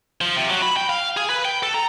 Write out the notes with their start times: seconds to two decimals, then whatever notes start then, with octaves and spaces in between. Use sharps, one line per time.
0.21 F3
0.36 C3
0.49 F#3
0.62 B5
0.77 G5
0.89 F5
1.17 G#4
1.30 B4
1.45 G5
1.63 A4
1.74 A#5